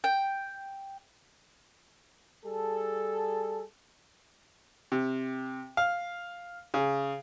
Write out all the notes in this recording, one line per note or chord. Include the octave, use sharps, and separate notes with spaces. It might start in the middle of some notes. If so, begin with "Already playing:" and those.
G5
G3 G#4 A4
C3
F5
C#3